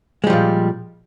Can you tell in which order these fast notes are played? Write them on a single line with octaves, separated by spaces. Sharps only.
G#3 G3 F3 A#2